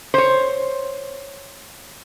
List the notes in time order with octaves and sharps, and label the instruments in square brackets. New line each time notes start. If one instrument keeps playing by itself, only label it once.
[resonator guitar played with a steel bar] C5 C#5